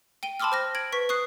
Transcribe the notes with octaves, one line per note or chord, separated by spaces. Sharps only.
G5 D#7 G7
A5 B5 C6 D6 E6 F6
C5 F6 A#6
G#6 D7 F#7
B4 C#6 B6
C#6 D#6 F#6 C7